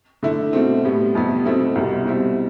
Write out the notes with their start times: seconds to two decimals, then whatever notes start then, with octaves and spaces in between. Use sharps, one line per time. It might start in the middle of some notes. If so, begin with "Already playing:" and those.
0.23 D3 A3 E4
0.53 B2 A3 C4
0.85 A2 G3 B3
1.15 F2 C3 G3 B3
1.45 B2 A3 C4 E4
1.75 C2 B2 G3
2.05 B2 G3 C4 E4